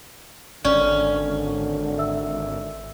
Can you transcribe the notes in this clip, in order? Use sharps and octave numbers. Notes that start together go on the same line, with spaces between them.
G#1 D3 C#4 D5
E5 E6